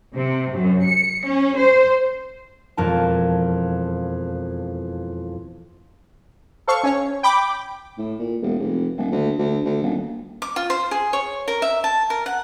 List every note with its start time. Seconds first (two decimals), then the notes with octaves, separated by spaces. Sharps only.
0.13 C3
0.53 F#2
0.84 C#7
1.25 C#4
1.56 C5
2.77 E1 F2 A#4 A5
6.68 A4 C5 F5 C#6
6.83 C#4 C#5
7.23 G5 B5 D6
7.98 A2
8.19 A#2
8.42 E1
8.59 F1
8.97 D#1
9.11 D2
9.38 D2
9.65 D2
9.83 D#1
10.42 D6
10.56 F4
10.70 C5
10.91 G#4
11.13 C#5
11.48 A#4
11.62 E5
11.84 A5
12.10 A#4
12.26 F#5